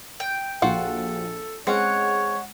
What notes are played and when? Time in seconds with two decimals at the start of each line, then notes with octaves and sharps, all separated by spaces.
0.20 G5
0.62 A#1 F4 F#4 A4 F#5
1.67 G#3 C4 C#4 C#5 F#5